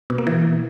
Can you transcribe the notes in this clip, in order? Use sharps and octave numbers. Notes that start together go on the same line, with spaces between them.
B2
A#3
E3